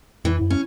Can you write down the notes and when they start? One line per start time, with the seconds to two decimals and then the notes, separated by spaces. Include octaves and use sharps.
0.24 F2 E3
0.41 F#2
0.50 C#4